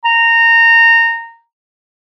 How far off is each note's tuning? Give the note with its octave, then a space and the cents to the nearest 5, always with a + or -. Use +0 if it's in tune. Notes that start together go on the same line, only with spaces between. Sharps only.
A#5 -20